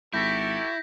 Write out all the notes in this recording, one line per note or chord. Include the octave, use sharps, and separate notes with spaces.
G#1 E4 F#4 G4 A4 G6 A#6 B6